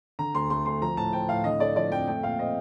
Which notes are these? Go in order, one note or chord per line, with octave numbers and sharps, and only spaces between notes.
D3 A#5
D2 C6
A3 C6
D2 C6
F3 A#5
A2 A5
C4 G5
A2 F5
D3 D#5
A3 D5
F3 D5
F2 G5
A3 G5
A#2 F5
C4 D#5